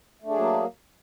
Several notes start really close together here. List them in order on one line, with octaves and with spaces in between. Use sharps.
A3 D4 G#4 F#3 A#3